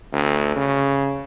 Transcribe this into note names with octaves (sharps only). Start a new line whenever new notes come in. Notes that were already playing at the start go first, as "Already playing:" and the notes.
D2
C#3